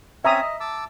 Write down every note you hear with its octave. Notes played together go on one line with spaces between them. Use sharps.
C4 C#4 C#5 E5 A#5 D#6
D#5
A5 D6 E6